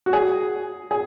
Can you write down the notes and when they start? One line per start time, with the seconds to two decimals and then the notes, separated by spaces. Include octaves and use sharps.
0.06 F#4
0.13 G#4
0.91 G#4